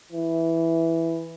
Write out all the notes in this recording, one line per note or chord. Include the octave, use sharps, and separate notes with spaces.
E3